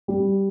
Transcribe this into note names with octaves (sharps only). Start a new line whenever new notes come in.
G3